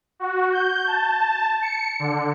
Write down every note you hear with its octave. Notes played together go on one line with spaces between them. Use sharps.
F#4
G6
A5
C#7
D3